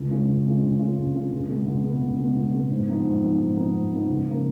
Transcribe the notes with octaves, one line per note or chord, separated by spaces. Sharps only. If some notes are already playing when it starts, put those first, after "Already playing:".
Already playing: C#2
C#3 G#3 C#4 F4
C#2
C#3 G#3 C#4 F4
C#2
C#3 G#3 C#4 F4
C#2
C#3 G#3 C#4 F4
C#2
B2 G#3 B3
C#2
B2 G#3 B3
C#2
B2 G#3 B3
C#2
B2 G#3 B3
G#2
F3 B3 D#4
G#2
F3 B3 D#4
G#2
F3 B3 D#4
G#2
F3 B3 D#4
C#2
C#3 F3 A#3